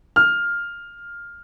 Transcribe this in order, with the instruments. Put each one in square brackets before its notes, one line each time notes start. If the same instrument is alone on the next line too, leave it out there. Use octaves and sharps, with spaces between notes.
[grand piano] F6